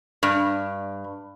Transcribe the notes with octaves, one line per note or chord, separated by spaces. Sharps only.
G2